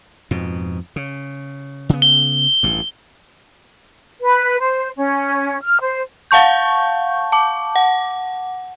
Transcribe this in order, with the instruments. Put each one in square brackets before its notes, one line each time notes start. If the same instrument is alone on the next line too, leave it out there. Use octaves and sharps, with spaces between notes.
[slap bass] F2 G#2 B2
C#3
C#3 B3
[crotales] G7
[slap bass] A1 G2
[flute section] B4
C5
C#4
F6
C5
[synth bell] F5 F#5 A5 C#6 G6
A5 D6
F#5